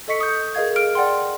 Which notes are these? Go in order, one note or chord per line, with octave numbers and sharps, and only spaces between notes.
A4 D#5 C#6 B6 C#7
D#6 G6
G#4 A#4 D#5 F5 G#6
F6 D7
D5 F#5 G5 C6